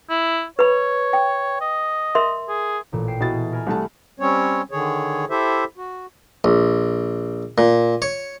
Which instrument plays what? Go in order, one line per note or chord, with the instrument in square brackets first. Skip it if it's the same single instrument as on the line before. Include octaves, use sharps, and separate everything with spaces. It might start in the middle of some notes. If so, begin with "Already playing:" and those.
[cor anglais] E4
[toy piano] B4 B5 [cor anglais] C#5
[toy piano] G5
[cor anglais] D#5
[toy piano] A#4 E5 C6
[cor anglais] G#4
[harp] A1 A#2
G5 C7 E7
[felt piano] B2 A6 [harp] E4 G#4
[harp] A#4 G#5 B5
[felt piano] C2 A3 A5
[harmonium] G3 C4 C#4 C#5
D3 D#3 G#4 C#5
E4 G4 A4 C5 E5
F#4
[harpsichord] A#1
A#2
C#5